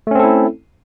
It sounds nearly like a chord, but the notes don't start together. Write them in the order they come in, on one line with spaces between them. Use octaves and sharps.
A3 C#4 C4 A4 E4